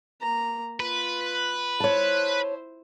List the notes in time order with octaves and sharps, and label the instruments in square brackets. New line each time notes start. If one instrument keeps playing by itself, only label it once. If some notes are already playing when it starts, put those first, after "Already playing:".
[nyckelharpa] A#3 A#5
[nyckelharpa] F4 [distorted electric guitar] B4
[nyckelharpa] E4 C5 [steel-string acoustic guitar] C#5 A5